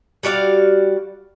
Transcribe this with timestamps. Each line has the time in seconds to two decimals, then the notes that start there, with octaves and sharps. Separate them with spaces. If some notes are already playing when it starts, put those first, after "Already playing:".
0.23 G3 F#4 D5 F5